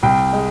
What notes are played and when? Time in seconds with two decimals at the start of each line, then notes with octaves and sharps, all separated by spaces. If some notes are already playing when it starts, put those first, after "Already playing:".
0.03 C2 G5
0.33 G#3